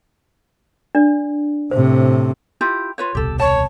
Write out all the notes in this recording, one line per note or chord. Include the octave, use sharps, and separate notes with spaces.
D4 D5
A2 C3 C5
E4 F4 G4
F4 B4 C#5
D#1 C2 B2 G4 A4
C#5 A5